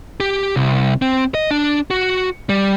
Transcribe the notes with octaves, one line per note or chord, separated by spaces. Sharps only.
G4
C2
C4
D#5
D4
F#4
G3